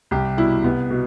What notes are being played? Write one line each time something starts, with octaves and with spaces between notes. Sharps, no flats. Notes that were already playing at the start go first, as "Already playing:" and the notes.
C2 G4
B2 G3 E4
C2 B3
B2